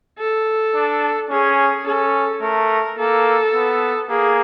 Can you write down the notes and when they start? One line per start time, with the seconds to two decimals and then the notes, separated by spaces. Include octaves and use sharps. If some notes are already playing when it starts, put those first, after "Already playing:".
0.19 A4
0.75 D4
1.30 C#4 G#4
1.87 C#4 A4
2.42 A3 A#4
2.98 A#3 A4
3.54 B3
4.10 A#3 G#4